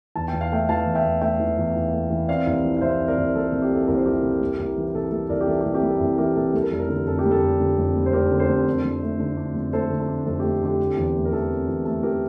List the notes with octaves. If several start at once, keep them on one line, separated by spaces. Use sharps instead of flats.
E2 A5
E2 G5
F5
A3 E5 G5
E3 F5 A5
E2
E5 G5
E2
A3 E5 G5
E3
E2
E2
A3
E3
C4 D5 F5
C2
F3
F5
C3 C5 E5
C4
A#4 D5
C2
F3 A4
C3
G4
C4 A4
C2 A#4
C5
F3 G4 A#4
C3
G3
C2
E3
A#4
C3 A4
G3 A4
C2 A#4 D5
G4
E3 A4
C3 G4
G4
G3 A4
C2
E3 G4 A#4
C3 A4
G3 A4
A#4
F1 A4
A#4
D3 A4
F2 A4
G4
G3
A4
F1
D3
F2
G3
C5
F1 G4 A#4
D3
A4 C5
F2
D4
F2
A3
D3
D4
F2
A3 A4 C5
D3
A4
D4
F2 A4
A3 G4
D3 G4
C4
E2
A3
A#4
E3 A4
C4
E2
A3 A4
E3 G4 A#4